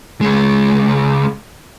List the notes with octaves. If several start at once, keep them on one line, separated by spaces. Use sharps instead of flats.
C#2 G#3